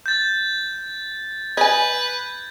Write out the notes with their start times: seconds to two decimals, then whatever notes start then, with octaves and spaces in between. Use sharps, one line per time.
0.06 G6 A6
1.57 B4 D#5 G#5 G#6